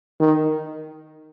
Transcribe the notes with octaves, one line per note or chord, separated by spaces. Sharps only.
D#3